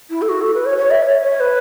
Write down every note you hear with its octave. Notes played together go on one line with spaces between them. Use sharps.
E4
A4
F#4
A4
B4
C#5
C#5
E5
C#5
C#5
B4